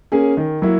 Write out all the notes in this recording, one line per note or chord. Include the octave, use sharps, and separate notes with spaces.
A#3 C#4 G#4
D#3
F#3 A#3 E4